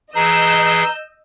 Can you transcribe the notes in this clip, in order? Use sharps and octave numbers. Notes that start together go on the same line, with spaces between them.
E3 G#4 D#5 A#5 E6 G6